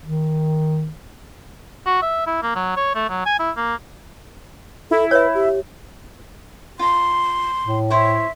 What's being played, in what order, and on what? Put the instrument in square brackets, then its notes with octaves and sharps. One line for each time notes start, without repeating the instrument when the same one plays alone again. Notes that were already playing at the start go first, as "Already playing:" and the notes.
[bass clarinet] D#3
[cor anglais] F#4
E5
E4
A#3
F#3
C#5
A3
F#3
G#5
E4
A#3
[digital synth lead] E4 [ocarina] A4
[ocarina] B4 [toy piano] C#5 E5
[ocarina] G4
[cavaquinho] F4 A#5 [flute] C6
[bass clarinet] A2
[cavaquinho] E4 C5 C#5 [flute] E5